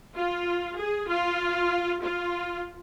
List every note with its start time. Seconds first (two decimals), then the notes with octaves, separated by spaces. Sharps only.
0.16 F4
0.79 G#4
1.09 F4
2.03 F4